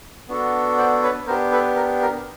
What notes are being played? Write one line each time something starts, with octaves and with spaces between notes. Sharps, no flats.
B3 D4 F#4 A4
C5 D5
B4 C#5
B3 D4 G4 A#4 C5
A4 B4
A#4
A#4